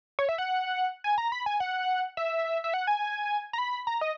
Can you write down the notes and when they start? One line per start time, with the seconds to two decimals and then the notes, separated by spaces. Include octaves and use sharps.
0.19 C#5
0.29 E5
0.38 F#5
1.04 G#5
1.18 A#5
1.32 B5
1.46 G#5
1.60 F#5
2.17 E5
2.64 E5
2.74 F#5
2.87 G#5
3.53 A#5
3.58 B5
3.87 A#5
4.01 D#5